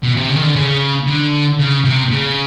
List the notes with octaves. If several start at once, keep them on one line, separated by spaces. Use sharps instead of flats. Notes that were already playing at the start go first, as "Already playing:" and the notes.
B2
C3
C#3
D#3
D3
C#3
D3
C#3
C3
C#3